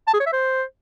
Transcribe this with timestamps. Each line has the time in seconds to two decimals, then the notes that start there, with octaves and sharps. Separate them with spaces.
0.07 A5
0.14 G#4
0.20 C#5
0.26 E5
0.33 C5